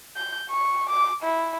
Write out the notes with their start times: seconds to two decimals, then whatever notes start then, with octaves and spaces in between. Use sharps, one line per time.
0.17 G6
0.50 C#6
0.89 D6
1.24 E4